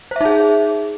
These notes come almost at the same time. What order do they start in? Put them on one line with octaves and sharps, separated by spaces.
C5 E5 D#4 G#4